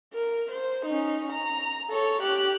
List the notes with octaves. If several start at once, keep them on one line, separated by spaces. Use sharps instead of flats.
A#4
C5
C#4 D#4
A#5
A4 C#5
G4 F#6